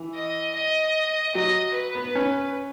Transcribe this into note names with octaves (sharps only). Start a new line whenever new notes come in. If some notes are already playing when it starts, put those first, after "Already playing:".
Already playing: E3
D#5
D#5
F#3 D#5
B4
B3
C#4